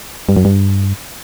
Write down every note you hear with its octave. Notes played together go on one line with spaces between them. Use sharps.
G2
F#2
G2